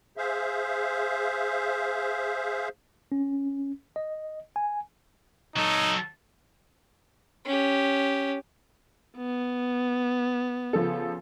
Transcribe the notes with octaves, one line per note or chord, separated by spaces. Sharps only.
G#4 C5 E5 F5
C#4
D#5
G#5
F#3 D#4 A4
C#4 G4
B3
C#3 F3 A4